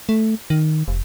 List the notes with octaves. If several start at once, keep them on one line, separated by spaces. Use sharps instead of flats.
A3
D#3
F1